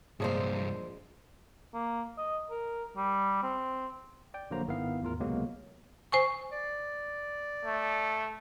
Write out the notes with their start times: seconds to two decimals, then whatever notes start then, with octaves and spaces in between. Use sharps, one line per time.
0.20 C2 G2 A#2 F3 G#3 D4 G#4 C5
1.74 A#3
2.18 D#5
2.50 A#4
2.96 G3
3.43 C4
4.34 D5 G5
4.50 A#1 D3 F#3 A#3 C5 A#5
4.68 G#1 D#3 B3 E4 F5
5.02 E2 A2 F4 A#4
5.20 C#2 C3 F#3 G#3 A#3 B3
6.12 C5 G#5 C#6
6.52 D5
7.65 A3